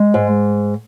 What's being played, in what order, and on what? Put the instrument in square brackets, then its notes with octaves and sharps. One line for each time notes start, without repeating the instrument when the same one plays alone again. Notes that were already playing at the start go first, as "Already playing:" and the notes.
Already playing: [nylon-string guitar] G#3
G#2